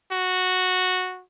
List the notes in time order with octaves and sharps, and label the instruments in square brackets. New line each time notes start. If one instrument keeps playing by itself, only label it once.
[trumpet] F#4